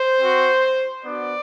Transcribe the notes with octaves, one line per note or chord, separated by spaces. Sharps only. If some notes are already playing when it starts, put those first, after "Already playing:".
Already playing: C5
C4 F#4
B3 D4 F#4 D5